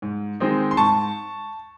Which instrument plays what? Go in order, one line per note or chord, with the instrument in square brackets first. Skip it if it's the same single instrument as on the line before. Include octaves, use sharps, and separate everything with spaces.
[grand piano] G#2
D#3 G#3 C4 D#4
C6
G#2 A5 C#6